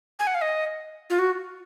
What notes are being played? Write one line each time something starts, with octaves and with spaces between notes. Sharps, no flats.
G#5
F#5
F5
D#5
F4
F#4